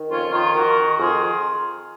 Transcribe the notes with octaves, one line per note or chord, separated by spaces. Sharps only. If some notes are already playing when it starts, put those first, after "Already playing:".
Already playing: D#3
F2 C#4 F4
D#3 C#4 F4
D#3 F#4 A#4
D#3
F2 F4 G#4